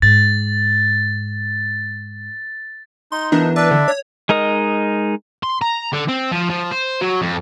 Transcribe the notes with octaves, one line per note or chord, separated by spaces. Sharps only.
G#2 A6
D#4 C6
E3 B3 D4 A#4
D4 B4 D5 E5
D3
C#5
G#3 D#4 A#4 D#5 D#6
C6
A#5
D3
C4
F3
F3
C5
F#3
F2